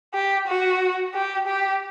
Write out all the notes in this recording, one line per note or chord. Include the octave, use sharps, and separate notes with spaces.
G4
F#4
G4
G4